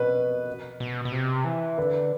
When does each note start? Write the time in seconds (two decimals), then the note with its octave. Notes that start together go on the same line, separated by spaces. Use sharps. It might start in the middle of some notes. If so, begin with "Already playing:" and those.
Already playing: B2 B4
0.80 B2
1.05 B2
1.12 C3
1.45 E3
1.78 D3 B4